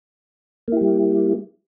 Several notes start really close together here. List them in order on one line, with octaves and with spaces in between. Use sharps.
A#3 E4 G4 G3